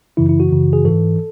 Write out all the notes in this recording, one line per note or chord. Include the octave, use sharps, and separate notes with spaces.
F#2 C#3 E3 E4
E4
F#4
F#2 C#3 E3
G#4
G#2 E3 A4